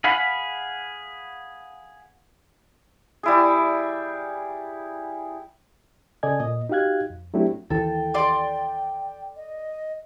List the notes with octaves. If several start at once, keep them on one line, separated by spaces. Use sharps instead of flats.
G#4 F5 F#5 B5
G3 E4 G#4
C#3 A4 D5 D#5 G#5 G#6
A#2 D#5
D#4 F#4 G4 F5 F#6 G#6
F2
F#3 A3 C4 D4 E4 G4
D#2 E3 A4 G5
D5 C6 D6
D#5